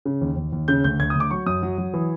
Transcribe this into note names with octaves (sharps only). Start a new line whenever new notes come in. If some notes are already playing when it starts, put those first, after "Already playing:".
C#3
D#2
D#2
D#2
C#3 G6
D2 G6
D2 G#6
D#6
D2 D6
F#3 C#6
F#2 D#6
F#3
F#3
E3